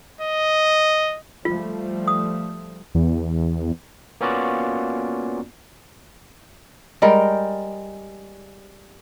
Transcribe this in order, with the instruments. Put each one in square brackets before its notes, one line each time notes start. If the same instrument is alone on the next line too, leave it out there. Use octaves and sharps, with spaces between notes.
[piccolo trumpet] D#5
[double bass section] F3 G3 A3 [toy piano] F4
[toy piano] D#6
[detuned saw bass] E2
[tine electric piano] A#3 B3 C#4 F4 F#4 D5
[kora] G3 G#3 A#4 G5